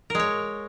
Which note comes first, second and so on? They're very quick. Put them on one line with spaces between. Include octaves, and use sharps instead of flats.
A#4 G#3 C#5